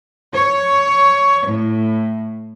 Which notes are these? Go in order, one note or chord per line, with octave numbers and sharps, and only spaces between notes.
C#5
A2